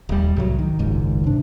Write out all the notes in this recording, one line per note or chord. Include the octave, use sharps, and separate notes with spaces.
D#1 G3
C2 A2 F#3
D#3
F#1 C#2 G#2 D#3
C3 D4